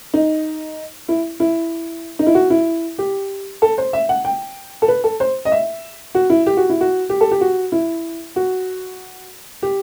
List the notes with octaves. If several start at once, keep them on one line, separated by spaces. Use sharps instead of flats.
D#4
E4
E4
D#4
E4
F#4
E4
G4
A4
C5
E5
F#5
G5
A4
B4
A4
C5
D#5
E5
F#4
E4
G4
F#4
E4
F#4
G4
A4
G4
F#4
E4
F#4
G4